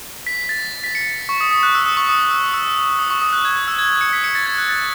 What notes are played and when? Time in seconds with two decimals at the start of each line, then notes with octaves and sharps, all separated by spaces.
0.27 B6
0.49 A6
0.84 B6
0.95 C#7
1.29 C#6
1.41 D#6
1.51 D#6
1.63 F#6
1.75 E6
1.86 D#6
1.97 C#6
2.09 D#6
2.31 E6
2.54 E6
2.99 D#6
3.10 C#6
3.22 D#6
3.33 F#6
3.45 G#6
3.68 E6
3.79 G#6
4.01 C#7
4.13 B6
4.24 C#7
4.35 A6
4.46 G#6
4.58 F#6
4.69 A6